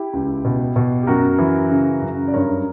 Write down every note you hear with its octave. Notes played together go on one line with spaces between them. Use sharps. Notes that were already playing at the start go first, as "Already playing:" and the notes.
Already playing: E4 G4
C#2
B2
B2
G4
F#2 F#4 A#4
E3
C#3
F#2
D5
G2 A#4 C#5